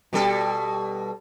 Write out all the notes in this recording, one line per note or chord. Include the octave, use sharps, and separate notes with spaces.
B2 G3 A4